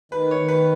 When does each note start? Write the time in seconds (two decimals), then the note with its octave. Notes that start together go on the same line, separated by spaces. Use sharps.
0.12 D#3 B4
0.31 C#5
0.39 D#3
0.48 B4